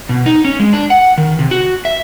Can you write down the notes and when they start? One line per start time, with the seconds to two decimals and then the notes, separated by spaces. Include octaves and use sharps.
0.09 B2
0.26 D#4
0.45 C#4
0.60 G#3
0.73 D4
0.90 F#5
1.18 D#3
1.39 C3
1.51 F#4
1.85 E5